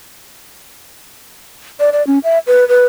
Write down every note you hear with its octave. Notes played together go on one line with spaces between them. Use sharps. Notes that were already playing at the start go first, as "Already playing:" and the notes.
D5
D5
C#4
E5
B4
B4